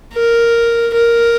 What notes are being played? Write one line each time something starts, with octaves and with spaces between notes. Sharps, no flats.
A#4
A#4